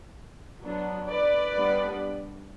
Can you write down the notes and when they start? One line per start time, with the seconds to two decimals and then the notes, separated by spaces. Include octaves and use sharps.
0.63 F#3 B3 D4
1.09 B4 D5
1.56 G3 B3 D4